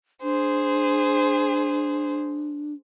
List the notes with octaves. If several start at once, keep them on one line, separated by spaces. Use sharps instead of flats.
D4 G#4 C5